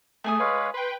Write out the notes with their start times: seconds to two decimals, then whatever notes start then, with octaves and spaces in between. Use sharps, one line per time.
0.24 A3 G#4 G#5 D#6
0.40 G#3 B4 C#5 F5
0.74 B4 G5 C6